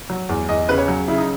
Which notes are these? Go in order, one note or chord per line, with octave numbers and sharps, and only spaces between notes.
F#3
E2
E2 D#5
C#3 B4
C#5
F#3
C#3 E4
D#4